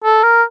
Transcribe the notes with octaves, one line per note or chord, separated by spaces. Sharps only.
A4
A#4